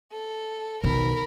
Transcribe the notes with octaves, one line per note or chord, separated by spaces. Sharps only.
A4
B1 D#3 A#4 B5